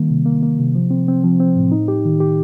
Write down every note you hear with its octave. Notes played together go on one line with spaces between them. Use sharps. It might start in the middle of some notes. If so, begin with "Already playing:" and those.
Already playing: D#3 G3 A#3
C3
A#3
A#3
C3
F3
C4
C4
F3
C4
A2
D#4
G4
D#3
G4